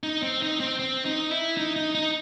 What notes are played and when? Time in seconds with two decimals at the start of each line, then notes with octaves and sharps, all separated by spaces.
0.03 D#4
0.23 C4
0.42 D#4
0.60 C4
0.79 C4
1.05 D#4
1.31 E4
1.57 D#4
1.76 D#4
1.95 D#4